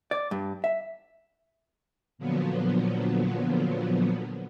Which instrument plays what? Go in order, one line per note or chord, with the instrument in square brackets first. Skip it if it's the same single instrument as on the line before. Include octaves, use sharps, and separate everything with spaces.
[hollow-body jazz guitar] D5
G2
E5
[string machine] A#2 D3 F3 F#3 B3